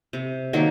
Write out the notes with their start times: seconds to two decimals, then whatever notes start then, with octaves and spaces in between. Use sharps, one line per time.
0.13 C3
0.53 D#3 F#3 A#3